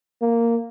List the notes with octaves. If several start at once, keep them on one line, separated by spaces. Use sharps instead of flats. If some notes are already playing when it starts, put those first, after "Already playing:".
A#3